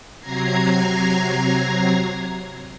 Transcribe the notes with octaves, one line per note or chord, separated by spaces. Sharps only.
C3 F#3 A#5 G#6 A#6 C7